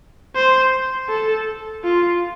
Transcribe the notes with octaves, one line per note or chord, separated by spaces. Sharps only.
C5
A4
F4